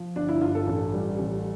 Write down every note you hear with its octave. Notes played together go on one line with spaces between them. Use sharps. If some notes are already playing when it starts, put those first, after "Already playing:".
Already playing: F3
G1 D4
E4
G2 F4
A4
A1
G3
A1